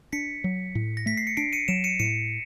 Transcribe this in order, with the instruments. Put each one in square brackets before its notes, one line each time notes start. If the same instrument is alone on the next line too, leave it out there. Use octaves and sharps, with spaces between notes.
[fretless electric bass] D4 [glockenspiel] B6 C#7
[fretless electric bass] F#3
A2
[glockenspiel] A#6
[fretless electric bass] A3 [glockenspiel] B6
[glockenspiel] C7
C#7
[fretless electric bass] D4 [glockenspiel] C7 D7
[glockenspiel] C#7 D#7
[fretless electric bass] F#3 [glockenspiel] D7 E7
[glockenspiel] C#7 D#7
[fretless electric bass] A2 [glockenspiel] C#7 D#7